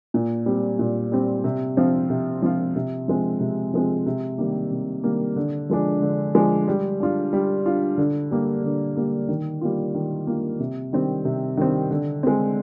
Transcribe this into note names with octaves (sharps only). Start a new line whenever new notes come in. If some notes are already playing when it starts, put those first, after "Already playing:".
A#2
G3 C4
A#2
G3 C4
C3
F3 C4 F4
C3
F3 C4 F4
C3
F3 G#3 C4
C3
F3 G#3 C4
C3
D#3 G3 A#3
C3
D#3 G3 A#3
D3
F3 G#3 D4
D3
F3 G#3 D4
G3
D4 F4
G3
D4 F4
D3
G3 A#3
D3
G3 A#3
D#3
G3 A#3 F4
D#3
G3 A#3 F4
C3
D#3 G3 C4
C3
D#3 G3 C4
D3
G#3 C4